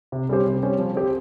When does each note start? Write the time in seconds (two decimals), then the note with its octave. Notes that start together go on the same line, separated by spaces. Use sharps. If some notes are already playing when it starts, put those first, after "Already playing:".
0.12 C3
0.29 G3 C#4 G4 C5
0.46 C3
0.63 G3 C#4 G4 C5
0.78 F3
0.95 C4 G4 C5